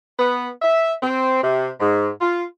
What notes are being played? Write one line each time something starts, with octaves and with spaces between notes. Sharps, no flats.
B3
E5
C4
C3
G#2
F4